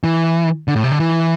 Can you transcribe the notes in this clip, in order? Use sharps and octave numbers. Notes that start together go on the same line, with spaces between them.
E3
D3
A2
C3
D3
E3